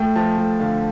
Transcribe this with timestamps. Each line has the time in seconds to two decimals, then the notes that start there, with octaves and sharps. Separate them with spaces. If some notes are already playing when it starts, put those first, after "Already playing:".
Already playing: A3 G5
0.16 F3 A5
0.38 A3 G5
0.60 D3 F5